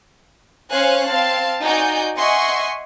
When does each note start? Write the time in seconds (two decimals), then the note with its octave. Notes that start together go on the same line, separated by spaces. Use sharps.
0.70 C#4 C5 C#5 F5 G#5 F#6
1.08 C4 F5 A5
1.62 D#4 F#4 D5 G#5 G6
2.18 D#5 E5 F#5 G#5 C6 C#6